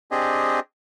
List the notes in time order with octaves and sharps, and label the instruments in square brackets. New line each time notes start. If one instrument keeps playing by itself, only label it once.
[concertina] C4 D4 G4 G#4 D#5